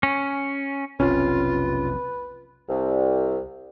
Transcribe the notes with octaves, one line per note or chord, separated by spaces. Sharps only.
C#4
F1 B1 C3 C#4 F4 B4
C2